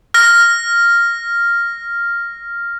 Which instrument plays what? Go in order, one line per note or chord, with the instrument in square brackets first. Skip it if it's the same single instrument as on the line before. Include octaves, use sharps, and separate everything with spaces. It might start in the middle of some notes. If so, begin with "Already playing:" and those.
[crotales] F6 A#6